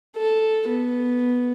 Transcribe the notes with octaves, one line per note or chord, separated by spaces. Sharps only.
A4
B3